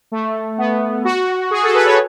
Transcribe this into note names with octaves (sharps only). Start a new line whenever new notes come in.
A3
B3
F#4
G#4
A4
B4
C#5